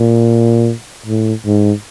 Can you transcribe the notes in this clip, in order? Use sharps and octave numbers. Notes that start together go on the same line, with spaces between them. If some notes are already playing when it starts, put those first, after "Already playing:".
Already playing: A#2
A2
G#2